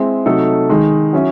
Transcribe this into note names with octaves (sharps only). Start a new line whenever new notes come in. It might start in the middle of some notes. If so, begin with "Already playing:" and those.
Already playing: G#3 C4 E4
C3 F#3 A3 D#4 A4
D#3 G#3 D#4
F#3 C#4 E4